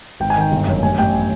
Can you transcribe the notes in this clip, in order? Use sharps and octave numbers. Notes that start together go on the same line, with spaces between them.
G#1 G5
G#5
D#3 G5
G1
F#2
A1 G#5
A1 G5